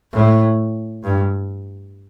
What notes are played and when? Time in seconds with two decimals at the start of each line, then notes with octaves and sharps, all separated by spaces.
0.12 A2
1.04 G2